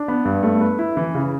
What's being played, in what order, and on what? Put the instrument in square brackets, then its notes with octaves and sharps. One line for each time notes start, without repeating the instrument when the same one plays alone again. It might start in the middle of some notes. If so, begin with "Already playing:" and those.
Already playing: [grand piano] D4
B3
G2
A3
B4
E4
E3
C#3